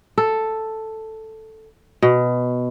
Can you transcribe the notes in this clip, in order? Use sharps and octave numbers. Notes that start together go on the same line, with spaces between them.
A4
B2